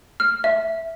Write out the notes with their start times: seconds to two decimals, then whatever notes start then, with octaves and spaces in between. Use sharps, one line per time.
0.20 F6
0.44 E5